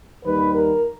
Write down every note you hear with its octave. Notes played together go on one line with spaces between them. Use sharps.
D#2 D#3 G3 A#3 B4
A#4